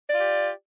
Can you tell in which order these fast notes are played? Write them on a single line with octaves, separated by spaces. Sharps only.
D5 F4 G4